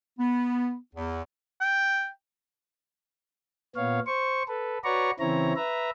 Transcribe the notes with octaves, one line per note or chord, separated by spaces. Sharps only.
B3
E2
G5
A#2 B3 C#5 F5
C5 C#6
A4 B4
F#4 B4 C#5 D5 A#5 C#6
C#3 E3 C4 E4 C#5 A#5
B4 E5 A#5